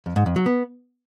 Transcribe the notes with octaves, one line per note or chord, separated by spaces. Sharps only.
F2
G#2
F2
F#3
B3